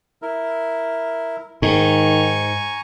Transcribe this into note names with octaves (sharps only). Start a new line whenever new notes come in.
E4 A#4
G#2 D#3 G#5 A#5 C#6